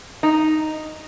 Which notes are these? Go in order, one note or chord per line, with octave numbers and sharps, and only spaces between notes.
D#4